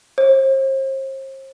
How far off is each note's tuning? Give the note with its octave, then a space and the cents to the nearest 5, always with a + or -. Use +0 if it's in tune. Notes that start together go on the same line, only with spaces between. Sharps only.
C5 +40